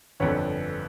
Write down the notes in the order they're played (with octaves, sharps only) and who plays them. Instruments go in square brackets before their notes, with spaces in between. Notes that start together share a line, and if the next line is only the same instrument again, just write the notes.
[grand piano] G1 F2 D3 B4 C#5